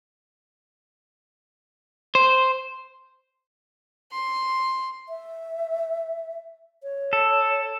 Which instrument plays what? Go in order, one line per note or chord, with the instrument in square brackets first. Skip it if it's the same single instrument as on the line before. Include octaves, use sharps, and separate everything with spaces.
[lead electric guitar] C5
[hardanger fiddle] C6
[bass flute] E5
C#5
[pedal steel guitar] A4